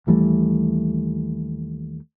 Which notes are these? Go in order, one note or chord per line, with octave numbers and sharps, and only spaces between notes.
D#2 E3 G3 A3